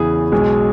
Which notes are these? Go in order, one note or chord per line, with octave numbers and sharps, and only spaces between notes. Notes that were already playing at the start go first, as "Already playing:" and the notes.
Already playing: E2 C#3 E3 G#4
B1 B2 G#3